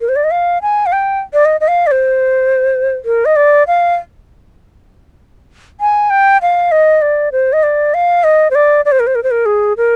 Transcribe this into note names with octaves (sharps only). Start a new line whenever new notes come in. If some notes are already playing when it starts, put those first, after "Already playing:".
A#4
C5
D5
D#5
F5
G#5
F5
G5
D5
D#5
D#5
F5
D5
C5
A#4
D#5
D5
F5
G#5
G5
F5
D#5
D5
C5
D#5
D5
F5
D#5
C5
D5
D5
C5
A#4
C5
A#4
C5
A#4
G#4
A#4